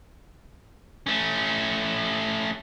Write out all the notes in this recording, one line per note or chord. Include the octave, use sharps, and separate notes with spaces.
A3 C#4